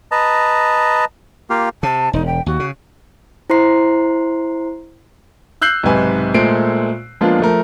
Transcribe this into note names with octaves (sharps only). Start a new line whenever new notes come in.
B4 D#5 A5 A#5
A#3 F4 G4 F5
C3 A5
E1 D#4
G5
D#2 F#4
C#3
E4 C5 A#5 C6 C7
E6 F#6 G6 C7 F#7
B1 G#2 C3 B4 G#5
A#2 G#3 A3 C5 C7 D7
F3 G#3 A#3 B3 D4 F4
F3 A3 A#4